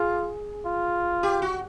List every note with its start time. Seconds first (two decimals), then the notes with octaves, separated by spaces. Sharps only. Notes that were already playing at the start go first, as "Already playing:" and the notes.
Already playing: F4 G#4
0.66 F4
1.23 G4
1.42 F#4